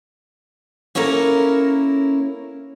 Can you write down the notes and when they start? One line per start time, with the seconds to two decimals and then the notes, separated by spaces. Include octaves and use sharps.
0.95 A#3 C#4 E4 A4 A#4